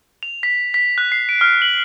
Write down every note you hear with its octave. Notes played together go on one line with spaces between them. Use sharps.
F7
B6
B6
F#6
C7
D7
F6
F#7